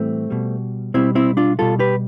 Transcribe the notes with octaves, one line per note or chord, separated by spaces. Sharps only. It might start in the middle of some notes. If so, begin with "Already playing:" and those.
Already playing: A2 E3 G3 A3 C4
B2 G3
B2 G3 C4 E4
C4 E4
D4 F4
B2 G3 F4 A4
G4 B4